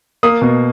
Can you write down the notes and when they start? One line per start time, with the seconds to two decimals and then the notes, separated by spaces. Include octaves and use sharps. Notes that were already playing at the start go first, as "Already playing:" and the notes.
0.23 A#3 D#6
0.42 B2